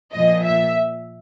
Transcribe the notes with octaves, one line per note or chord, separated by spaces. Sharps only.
A#2 F3 D#5
E5